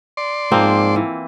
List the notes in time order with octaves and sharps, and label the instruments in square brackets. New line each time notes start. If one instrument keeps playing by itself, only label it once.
[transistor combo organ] D5 C6
[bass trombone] G#2 [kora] F3 A#3 C4
[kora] E3